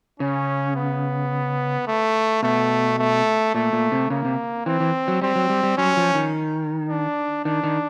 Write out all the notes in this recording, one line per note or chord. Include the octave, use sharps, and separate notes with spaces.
C#3 C#4
B3
A3
B2 A3
A3
A#2 A3
A#2
C3
C#3 A#3
C3
E3 C4
E3
F#3
G3 C4
F#3
G3
G3
F#3 C#4
F3
D#3
D4
D#3 D4
D#3